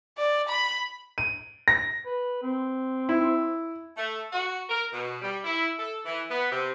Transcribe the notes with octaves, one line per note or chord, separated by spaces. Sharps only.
D5
B5
D#7
A#6
B4
C4
E4
A3
F#4
A#4
B2
G3
E4
A4
E3
B3
C3